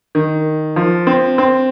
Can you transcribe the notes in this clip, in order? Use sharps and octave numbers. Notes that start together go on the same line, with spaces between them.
D#3
F3
C4
C4